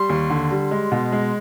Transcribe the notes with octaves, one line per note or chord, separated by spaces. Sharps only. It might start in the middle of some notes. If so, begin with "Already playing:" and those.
Already playing: G3 C6
D#2
D3
G3
G#3
B2
G#3